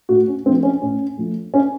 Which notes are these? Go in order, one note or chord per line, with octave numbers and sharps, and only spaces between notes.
A2 F#4
C#4
F3 A3 C4
C#4
A2 C#4
F3 A3
C#4